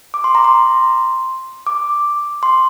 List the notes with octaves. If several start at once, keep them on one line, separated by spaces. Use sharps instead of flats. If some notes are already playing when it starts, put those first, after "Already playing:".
D6
C6
A#5
C6
D6
C6